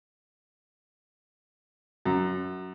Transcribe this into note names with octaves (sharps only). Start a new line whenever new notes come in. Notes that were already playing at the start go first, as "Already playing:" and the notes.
F#2